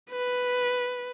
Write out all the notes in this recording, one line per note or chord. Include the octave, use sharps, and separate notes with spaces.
B4